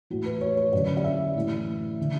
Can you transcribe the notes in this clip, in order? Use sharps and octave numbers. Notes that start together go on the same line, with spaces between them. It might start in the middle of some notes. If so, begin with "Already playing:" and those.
A2 E3 F#4
B4
C#5
C#5
F#2 D3 D5
D5
E5
A2 E3
D3